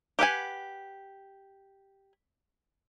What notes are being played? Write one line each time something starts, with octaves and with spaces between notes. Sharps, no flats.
G4 B4 F#5 G#5